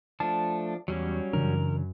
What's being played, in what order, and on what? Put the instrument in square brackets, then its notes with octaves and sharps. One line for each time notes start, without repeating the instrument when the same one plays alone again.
[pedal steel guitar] F3 D4 [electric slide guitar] A3 A5
[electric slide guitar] E2 [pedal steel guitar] F#3 G3 C#4
[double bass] F#2 [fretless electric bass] C#3 E3 D4 [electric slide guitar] A#4